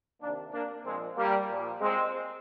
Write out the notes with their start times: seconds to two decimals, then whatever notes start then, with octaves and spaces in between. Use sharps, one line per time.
0.21 C3 D#3 A#3 D4
0.53 A#3 D4
0.85 A#2 F3 G#3 C4
1.17 G3 A#3
1.49 A#2 F3
1.81 G#3 C4